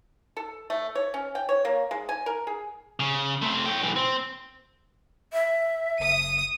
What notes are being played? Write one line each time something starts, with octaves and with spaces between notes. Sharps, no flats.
A4
A3
C#5
C#4
G5
C#5
A#3
G#3
G#5
A#4
G#4
C#3
A3 C4
C#5 G5
B1 E3
C4
E5
F#1 D#6 D#7